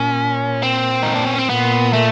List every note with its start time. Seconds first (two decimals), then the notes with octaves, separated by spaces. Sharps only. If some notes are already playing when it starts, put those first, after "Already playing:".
Already playing: A#2 C#4
0.63 C4
1.03 D#4
1.15 D4
1.26 C#4
1.38 C4
1.49 A#2 B3
1.93 A3